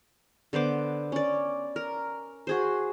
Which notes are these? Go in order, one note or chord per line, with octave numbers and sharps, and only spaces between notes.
D3 B3 C5 D6
C#4 D5
A#4
F#4 G#4 C5